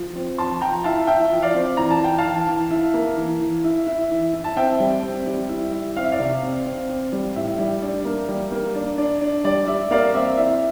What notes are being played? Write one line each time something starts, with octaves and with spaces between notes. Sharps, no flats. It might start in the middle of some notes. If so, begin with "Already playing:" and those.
Already playing: F3
C4
F3 A5 C6
F3 G5 A#5
E4 F5 A5
E4 E5 G5
F3
D5 F5
C4
E3 A#5
A5
E3 G5
F5 A5
E3
E3
E4
A#3
E3
E3
E4
E4
E3
E4
A5
C4 E5 G5
G3
C4
G3
E4
E4
C4 F5
E5
D5 F5
C3
C4
C4
C4
G3
A2 E5
G3
D4
A#3
G3
A#3
D4
D4
D4
G3 D5
G3 E5
A#3 D5 F5
C4 E5
E4 E5